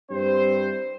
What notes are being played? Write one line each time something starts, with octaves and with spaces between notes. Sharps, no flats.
G2 C4 E4 C5